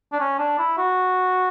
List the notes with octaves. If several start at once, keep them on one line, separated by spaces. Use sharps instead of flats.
D4
C#4
D4
E4
F#4